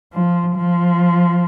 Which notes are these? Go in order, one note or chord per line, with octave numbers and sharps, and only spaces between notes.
F3
F3